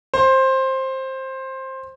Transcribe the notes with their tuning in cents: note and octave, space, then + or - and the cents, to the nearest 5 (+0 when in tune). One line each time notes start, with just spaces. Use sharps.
C5 +15